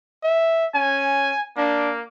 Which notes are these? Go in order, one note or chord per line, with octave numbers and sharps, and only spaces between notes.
E5
C#4 G#5
A#3 D4